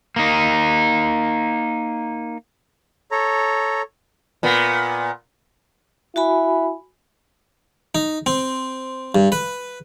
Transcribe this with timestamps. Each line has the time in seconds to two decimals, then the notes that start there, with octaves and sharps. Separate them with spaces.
0.16 A#3 D#4
3.11 A4 C#5 A#5
4.43 A#2 B3
6.16 E4 F#4 G#5 B5
7.95 D#4
8.26 C4
9.15 G2
9.32 B4